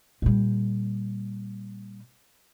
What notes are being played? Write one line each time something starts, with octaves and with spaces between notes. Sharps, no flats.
A#2 G3